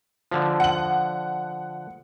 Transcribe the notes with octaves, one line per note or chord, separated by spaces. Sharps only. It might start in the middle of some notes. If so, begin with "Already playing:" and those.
D3 F3
F#5 F#7